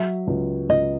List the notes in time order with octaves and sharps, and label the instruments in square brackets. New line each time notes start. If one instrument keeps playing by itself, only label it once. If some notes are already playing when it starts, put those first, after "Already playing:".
Already playing: [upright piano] F#3 [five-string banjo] E5
[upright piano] C#2
[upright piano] C#2 [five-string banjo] D#5